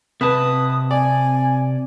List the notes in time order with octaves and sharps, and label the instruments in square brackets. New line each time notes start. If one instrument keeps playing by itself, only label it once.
[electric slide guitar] C3 A5 [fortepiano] B4 [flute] D#6
[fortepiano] D5 [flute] G#5